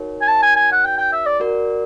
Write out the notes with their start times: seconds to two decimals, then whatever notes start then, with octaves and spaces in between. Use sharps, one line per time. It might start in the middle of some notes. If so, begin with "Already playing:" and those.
Already playing: D#4 F#4 A#4 C#5
0.22 G#5
0.28 A5
0.42 G#5
0.56 G#5
0.72 F#5
0.84 G5
0.97 G5
1.13 E5
1.26 D5
1.40 F#4 A#4 D5